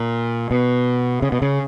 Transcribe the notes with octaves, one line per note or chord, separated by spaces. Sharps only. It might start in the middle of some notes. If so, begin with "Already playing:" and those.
Already playing: A#2
B2
C#3
B2
C#3